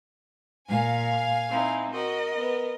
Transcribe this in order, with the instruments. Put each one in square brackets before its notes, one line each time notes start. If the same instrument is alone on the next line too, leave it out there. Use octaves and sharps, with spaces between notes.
[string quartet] A#2 [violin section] F5 G#5
[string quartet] C4 D#4 E4
[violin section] F#4 [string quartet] A#4 D#5
[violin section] B3